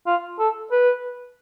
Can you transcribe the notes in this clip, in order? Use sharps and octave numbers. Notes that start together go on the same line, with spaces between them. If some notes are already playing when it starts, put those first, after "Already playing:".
F4
A4
B4